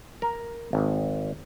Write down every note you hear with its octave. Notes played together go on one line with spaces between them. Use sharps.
A#4
G#1